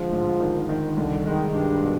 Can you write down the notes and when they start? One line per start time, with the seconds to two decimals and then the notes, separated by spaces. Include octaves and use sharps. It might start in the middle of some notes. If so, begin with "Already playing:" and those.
Already playing: D3 F3 G#3
0.12 G#2
0.40 D#3
0.69 D#3
0.97 C2 D3
1.26 D#3 G#3
1.55 G2 D4
1.84 B2